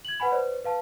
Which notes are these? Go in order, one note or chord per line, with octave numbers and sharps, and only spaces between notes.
G#6 F#7
B4 F#5 G#5 B5
B4 C5 D5
B4 F5 A5